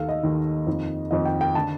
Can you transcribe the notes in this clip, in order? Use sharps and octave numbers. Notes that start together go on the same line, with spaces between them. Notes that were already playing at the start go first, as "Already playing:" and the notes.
Already playing: D#2 D#3 A4 F5
D#5
D#2 D#3
F2 D#3
F2 D#3 D#5
G5
G5
D3 A5